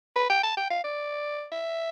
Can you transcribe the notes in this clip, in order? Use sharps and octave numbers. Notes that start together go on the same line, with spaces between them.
B4
G5
A5
G5
F5
D5
E5